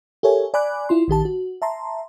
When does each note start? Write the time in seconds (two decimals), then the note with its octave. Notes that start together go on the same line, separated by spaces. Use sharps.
0.23 G4 A4 A#4 C#5 E5 G#5
0.54 D5 G#5 B5 D6 F#6
0.89 E4 F4 C6
1.08 A#1 D#3 G4 A5
1.25 F#4
1.62 E5 A5 A#5 C6